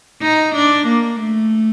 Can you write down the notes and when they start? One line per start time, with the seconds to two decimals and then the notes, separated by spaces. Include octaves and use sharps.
0.22 D#4
0.55 D4
0.88 A#3
1.20 A3